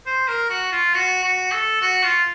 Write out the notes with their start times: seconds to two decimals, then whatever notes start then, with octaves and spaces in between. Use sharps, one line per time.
0.06 C5
0.28 A#4
0.50 F#4
0.72 F4
0.94 F#4
1.23 F#4
1.52 A4
1.82 F#4
2.03 F4